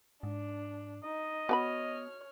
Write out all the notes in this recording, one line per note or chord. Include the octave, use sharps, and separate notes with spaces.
G#2 D4
D#4 D#5
B3 F#4 C#5 G#5 B5 F6